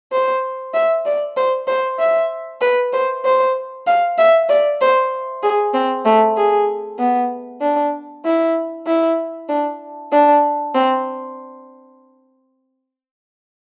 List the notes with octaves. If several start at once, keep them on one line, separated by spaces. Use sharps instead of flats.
C5
E5
D5
C5
C5
E5
B4
C5
C5
F5
E5
D5
C5
G#4
C4
A3
G#4
B3
D4
E4
E4
D4
D4
C4